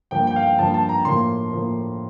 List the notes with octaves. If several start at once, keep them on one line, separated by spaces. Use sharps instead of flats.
G2 F3 A#3 G5
G5
F5
G5
G2 F3 A#3 A5
A5
A#5
A2 F3 A#3 C6
A2 F3 A#3